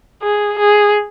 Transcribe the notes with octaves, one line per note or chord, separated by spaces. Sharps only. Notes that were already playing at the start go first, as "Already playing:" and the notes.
G#4
G#4